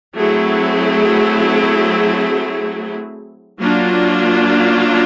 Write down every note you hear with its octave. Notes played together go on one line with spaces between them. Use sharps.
F#3 A3 C4 E4 G#4
F#3 A#3 D4 F4